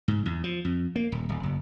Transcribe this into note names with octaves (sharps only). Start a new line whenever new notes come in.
G#2
E2
F3
F2
A#3
D#1
D1
F#1